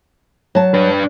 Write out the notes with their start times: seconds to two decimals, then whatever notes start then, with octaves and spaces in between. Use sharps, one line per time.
0.55 F#3 A5
0.74 D4 B4